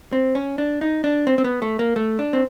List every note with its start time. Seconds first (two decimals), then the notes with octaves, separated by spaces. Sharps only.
0.13 C4
0.35 C#4
0.58 D4
0.81 D#4
1.04 D4
1.27 C4
1.38 C4
1.44 B3
1.62 A3
1.79 A#3
1.96 A3
2.19 D4
2.33 C4